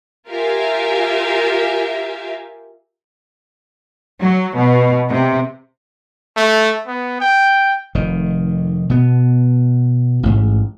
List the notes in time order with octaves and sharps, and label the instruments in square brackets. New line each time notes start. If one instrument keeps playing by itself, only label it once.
[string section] F4 G4 A#4 E5 F5 G#5
[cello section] F#3
B2
C3
[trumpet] A3
B3
G5
[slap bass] F1 D#3
B2 B3
A1 G#2